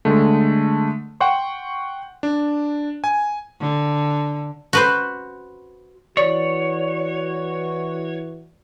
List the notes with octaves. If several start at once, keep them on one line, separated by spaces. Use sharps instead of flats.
D3 G#3 A3
F#5 G5 C6 C#6
D4
G#5
D3
F#4 B4 C5
E3 F#4 C#5 D5